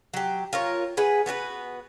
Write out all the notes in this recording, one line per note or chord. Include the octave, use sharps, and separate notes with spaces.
F#3 G4
F4 A#4 C#5
G#4 B4 F#5
B3 F#4 G4 B4